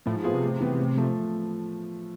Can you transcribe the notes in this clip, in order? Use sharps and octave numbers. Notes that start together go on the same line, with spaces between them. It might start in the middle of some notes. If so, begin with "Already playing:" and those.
A2 F3
G#2
A2 B3 F4 G#4 C5
C3
A2
E3 B3
A2
F3 A3